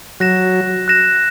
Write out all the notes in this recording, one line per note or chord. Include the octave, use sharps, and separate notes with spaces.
F#3 F#6 A#6 E7
F#6 A#6 E7